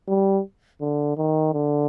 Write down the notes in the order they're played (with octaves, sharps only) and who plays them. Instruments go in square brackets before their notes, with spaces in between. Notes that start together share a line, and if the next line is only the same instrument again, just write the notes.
[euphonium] G3
D3
D#3
D3